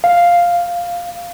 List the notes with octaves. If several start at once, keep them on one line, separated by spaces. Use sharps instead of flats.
F5